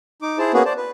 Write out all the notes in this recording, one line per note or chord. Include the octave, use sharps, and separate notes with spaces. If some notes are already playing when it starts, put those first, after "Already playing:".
D#4 D6
E4 G#4 C5 A5
A#3 B3 C#4 F#4 G#4 B4
C5 D5 A5
B4